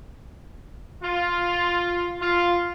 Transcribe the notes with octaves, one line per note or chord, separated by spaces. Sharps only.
F4
F4